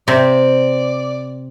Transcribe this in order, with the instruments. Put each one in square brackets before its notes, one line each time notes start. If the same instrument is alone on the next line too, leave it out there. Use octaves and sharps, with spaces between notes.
[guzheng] C3 [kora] C4 [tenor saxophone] D5